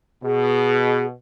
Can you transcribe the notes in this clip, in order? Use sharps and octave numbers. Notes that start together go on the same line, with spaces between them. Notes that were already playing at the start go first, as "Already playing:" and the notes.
B2 G#4